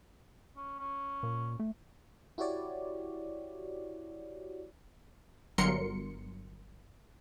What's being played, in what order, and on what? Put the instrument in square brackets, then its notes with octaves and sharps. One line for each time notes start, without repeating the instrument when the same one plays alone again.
[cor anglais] C#4
C#4
[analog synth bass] A#2
A3
[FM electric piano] E4 F#4 G4 C#5 D5
[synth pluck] G1 F#3 A#4 C6 C#7